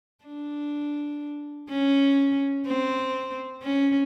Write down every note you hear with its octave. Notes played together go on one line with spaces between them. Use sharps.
D4
C#4
C4
C#4